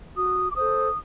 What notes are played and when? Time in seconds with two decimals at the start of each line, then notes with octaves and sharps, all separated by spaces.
0.16 F#4 D#6
0.51 D6
0.56 A4 C5 D#6